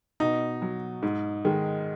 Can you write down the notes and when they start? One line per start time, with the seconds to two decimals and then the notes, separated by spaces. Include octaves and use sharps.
0.20 B2 D#4
0.62 F#3
1.03 G#2
1.45 D#3 G#3